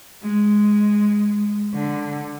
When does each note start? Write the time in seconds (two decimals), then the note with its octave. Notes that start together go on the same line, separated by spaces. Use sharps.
0.24 G#3
1.74 D3